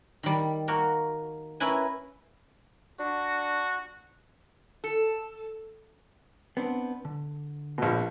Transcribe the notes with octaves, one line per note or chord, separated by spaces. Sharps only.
D#3 G3
A#3 F#4 A#4
C#4 E4 A#4 B4 G#5
D4 F#4
A4
B3 C4 D4
D3
A#1 B2